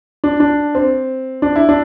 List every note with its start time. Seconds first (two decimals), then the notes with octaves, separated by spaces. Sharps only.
0.24 D4
0.40 D4
0.75 C4
1.42 D4
1.56 E4
1.69 D4